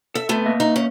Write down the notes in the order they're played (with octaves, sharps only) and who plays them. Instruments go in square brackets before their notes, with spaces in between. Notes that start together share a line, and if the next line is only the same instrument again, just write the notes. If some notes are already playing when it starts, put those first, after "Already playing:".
[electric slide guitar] A4 [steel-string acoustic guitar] E5
[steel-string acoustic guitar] C3 A3 B3
[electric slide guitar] A#3 D#5 E5
[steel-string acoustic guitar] D#4
C#4